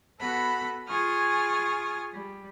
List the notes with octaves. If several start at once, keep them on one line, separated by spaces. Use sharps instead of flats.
B3 F#4 A4 F#5 B5
F4 G#4 G#5 C#6 D#6 F6
G3